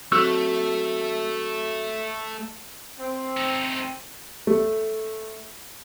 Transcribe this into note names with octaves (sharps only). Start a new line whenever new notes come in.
F#3 A3 C4 C#6 E6 F#6
C4
A3 D#4
A3